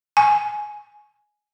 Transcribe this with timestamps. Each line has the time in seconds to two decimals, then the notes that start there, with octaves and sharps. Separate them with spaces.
0.17 G#5